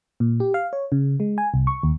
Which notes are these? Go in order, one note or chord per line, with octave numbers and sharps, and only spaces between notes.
A#2
G4
F5
C#5
C#3
G#3
G#5
C2
C#6
D#2